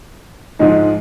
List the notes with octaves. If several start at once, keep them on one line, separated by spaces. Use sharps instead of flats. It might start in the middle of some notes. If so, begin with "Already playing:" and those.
G#2 F3 G#3 D#4